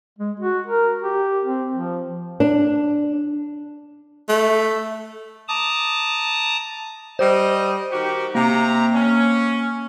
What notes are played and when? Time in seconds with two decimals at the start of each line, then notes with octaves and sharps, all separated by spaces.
0.19 G#3
0.40 F#4
0.67 A#4
1.02 G4
1.45 C4
1.75 F3
2.40 D4
4.29 A3
5.48 A5 A#5 D6 D#6
7.19 G3 C5 D#5
7.90 D#3 F#4 G4
8.35 C3 A#3 A#5
8.94 C#4